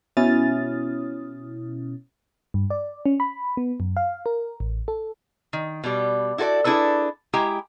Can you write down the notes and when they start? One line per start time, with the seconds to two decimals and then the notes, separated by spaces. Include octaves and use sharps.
0.17 B2 C#4 E4 D#6 F6 A6
2.54 G2
2.70 D5
3.06 C#4
3.20 B5
3.57 B3
3.80 F#2
3.97 F5
4.26 A#4
4.60 A1
4.88 A4
5.53 D#3
5.84 B2 G3
6.38 E4 F#4 A4 B4 D5
6.64 D4 E4 G#4 A4 B4
7.33 G#3 E4 G4 G5 A#5